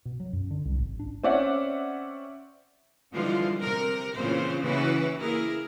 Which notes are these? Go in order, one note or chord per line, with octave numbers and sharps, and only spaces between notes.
B2
F#3
F#2
D3
C2
G#1
D4
C4 C#4 D5 E5 F#5
D3 E3 F3 G3 G#3 F4
C3 A#4
A#2 C#3 E3 C4 F4 C5
C#3 E3 A#3 E4 F#4 B4
A#3 E4 G#4 A#4